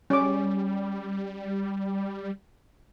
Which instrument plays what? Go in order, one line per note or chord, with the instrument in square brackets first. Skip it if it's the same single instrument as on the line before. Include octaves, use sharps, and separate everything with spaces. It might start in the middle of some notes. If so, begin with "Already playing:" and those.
[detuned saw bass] G3 [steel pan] C#4 D6